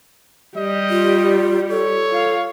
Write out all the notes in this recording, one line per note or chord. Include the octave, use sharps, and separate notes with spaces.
G3 G4 D#5
F4
A4 C#5
F4 F5